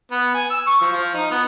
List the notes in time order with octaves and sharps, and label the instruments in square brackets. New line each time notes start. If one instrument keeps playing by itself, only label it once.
[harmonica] B3
G#5
E6
C#6
F3
F3
D#4
B3